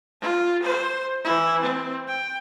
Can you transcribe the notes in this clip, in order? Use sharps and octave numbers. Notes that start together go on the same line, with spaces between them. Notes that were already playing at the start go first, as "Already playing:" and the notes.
F4
C5
E3 E4
C4
G5